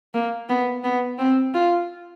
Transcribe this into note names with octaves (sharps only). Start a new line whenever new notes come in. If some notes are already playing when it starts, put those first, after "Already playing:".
A#3
B3
B3
C4
F4